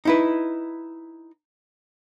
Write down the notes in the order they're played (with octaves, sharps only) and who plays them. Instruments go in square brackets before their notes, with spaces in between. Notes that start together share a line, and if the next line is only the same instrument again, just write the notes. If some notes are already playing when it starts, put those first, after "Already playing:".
[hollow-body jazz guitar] D#4 E4 B4